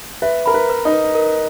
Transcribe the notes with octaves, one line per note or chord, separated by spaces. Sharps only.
B4 E5
A#4 B5
B4
B4
D#4
B4
A#4